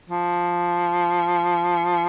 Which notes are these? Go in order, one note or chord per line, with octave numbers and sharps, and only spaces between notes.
F3